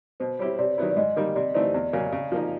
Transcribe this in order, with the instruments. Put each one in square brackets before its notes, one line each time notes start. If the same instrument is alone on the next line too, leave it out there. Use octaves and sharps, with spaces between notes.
[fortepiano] B2 [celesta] C5
[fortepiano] G3 C4 E4 G4 [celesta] C#5
[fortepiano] C3 [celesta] D5
[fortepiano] D#3 F#3 B3 E4
[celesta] D5
[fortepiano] G#2 [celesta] D#5
[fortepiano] D#3 G3 A#3
[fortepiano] C3 [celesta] D5
[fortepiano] E3 A3 C4 D#4 [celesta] D5
[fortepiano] E2
C#3 F#3 A#3 C#4
C#3
F3 A#3 D#4